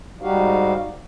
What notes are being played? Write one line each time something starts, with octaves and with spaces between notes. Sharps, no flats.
G#2 G3 D#4 F#4 G4 F5